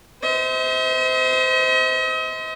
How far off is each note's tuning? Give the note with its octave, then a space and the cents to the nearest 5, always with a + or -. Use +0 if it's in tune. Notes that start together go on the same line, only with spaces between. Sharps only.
C5 -20 D#5 +45